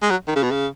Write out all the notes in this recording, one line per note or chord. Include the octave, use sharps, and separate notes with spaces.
G#3
F#3
D#3
C#3
B2
C#3